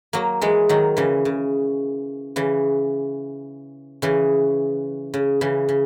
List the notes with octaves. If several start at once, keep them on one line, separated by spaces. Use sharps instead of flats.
F#3 A#3
E3 G#3
D#3 F#3
C#3 E3
C#3
C#3 E3
C#3 E3
C#3
C#3 E3
C#3